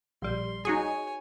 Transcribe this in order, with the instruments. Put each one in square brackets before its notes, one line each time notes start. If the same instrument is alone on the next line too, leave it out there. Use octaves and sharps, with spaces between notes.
[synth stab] A#1 G3 [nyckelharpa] C6
[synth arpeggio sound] D#4 F#4 G#4 [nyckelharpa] C#5 G#5